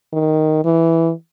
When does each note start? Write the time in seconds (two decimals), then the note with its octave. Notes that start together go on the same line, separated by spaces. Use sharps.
0.13 D#3
0.64 E3